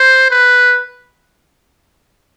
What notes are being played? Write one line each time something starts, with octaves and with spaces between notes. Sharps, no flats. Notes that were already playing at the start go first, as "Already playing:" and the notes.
Already playing: C5
B4